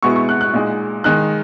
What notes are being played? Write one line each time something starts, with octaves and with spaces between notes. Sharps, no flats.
B2 G#3 B3 E4 C#6
C#6
F#6
F#6
A#2 G#3 D#4
D#3 G#3 D#4 F#6